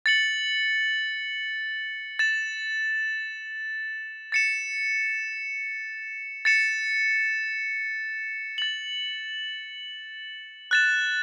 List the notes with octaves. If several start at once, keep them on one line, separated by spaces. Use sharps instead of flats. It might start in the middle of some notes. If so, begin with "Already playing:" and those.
A6 C#7 F#7
A6 E7
A6 C#7 E7
A6 C#7 E7
A6 F#7
F#6 A6 E7